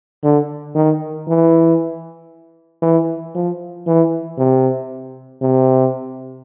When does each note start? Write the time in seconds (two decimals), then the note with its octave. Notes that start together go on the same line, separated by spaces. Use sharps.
0.24 D3
0.75 D#3
1.28 E3
2.82 E3
3.35 F3
3.87 E3
4.38 C3
5.42 C3